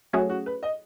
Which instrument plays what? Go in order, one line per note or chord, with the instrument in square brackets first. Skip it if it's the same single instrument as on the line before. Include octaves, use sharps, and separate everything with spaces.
[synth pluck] F#3 A3 C#4 G#4 [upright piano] F#4
[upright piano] F#4
B4
D#5